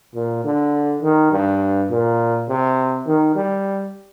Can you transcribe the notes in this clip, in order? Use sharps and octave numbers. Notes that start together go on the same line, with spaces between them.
A#2
D3
D#3
G2
A#2
C3
D#3
G3